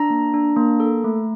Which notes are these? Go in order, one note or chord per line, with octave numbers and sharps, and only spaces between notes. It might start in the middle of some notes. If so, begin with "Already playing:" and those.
Already playing: D4 A#5
A#3
D4
A#3
A4
A3